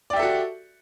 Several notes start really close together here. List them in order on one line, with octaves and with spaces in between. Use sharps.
D5 G4 E5 A4 F#4